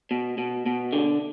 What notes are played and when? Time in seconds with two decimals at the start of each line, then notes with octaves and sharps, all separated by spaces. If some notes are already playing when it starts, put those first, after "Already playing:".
0.11 B2
0.38 B2
0.66 B2
0.93 D3